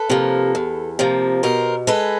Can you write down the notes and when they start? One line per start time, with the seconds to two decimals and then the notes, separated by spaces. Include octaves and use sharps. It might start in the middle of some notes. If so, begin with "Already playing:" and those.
Already playing: A4 B4
0.10 C3 F3 A#3
0.55 E2
0.99 C3 F3 A#3
1.43 B2 A#4 C5
1.87 G#3 A4 B4